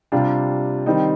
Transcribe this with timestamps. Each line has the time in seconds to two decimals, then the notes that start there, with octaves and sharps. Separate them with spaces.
0.12 C3 G3 D4 F4
0.86 D#3 G3 C4 D#4